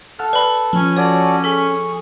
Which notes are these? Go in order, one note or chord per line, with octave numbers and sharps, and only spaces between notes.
A4 F#5 A5 F6
B4 D5 B5
F3 C#4
F#4 A4 C#5 D5
G#4 A4 C#6 B6